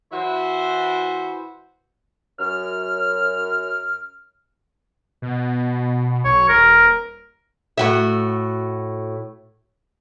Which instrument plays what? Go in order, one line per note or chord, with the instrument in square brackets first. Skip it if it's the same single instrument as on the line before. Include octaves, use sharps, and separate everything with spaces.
[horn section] E3 E4 F#4 C5
[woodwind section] F#2 F6
[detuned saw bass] B2
[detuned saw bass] B1 [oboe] C#5
[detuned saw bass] D#1 [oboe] A#4
[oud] A2 F#4 E5